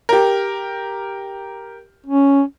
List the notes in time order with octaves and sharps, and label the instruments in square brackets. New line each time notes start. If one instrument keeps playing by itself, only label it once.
[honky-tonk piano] G4 A#4
[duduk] C#4